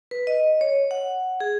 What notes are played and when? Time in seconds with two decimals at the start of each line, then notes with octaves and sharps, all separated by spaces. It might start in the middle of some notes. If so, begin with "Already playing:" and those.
0.11 B4
0.27 D#5
0.61 C#5
0.91 F#5
1.40 G#4